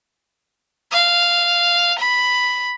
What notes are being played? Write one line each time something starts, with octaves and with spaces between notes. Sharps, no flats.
F5
B5